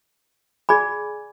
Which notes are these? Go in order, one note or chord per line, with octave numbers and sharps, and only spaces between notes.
G#4 D5 G#5 B5